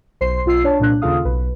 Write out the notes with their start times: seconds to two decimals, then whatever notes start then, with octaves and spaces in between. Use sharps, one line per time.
0.21 B1 C5 C6 C7
0.46 B1 F4 E6 C7
0.64 D4 C#5 A5
0.79 C2 A#2 D4 F#6
1.02 D#2 C#3 F4 A4 F5 D#6
1.25 B1 B4